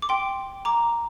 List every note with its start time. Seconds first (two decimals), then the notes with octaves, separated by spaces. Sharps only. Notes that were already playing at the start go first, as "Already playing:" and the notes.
0.02 D6
0.09 G5 C6
0.65 A#5 D6